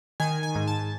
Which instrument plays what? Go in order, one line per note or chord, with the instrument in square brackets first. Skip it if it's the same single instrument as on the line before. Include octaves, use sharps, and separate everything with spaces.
[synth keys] D#3 G#5
G#5
G#2
A5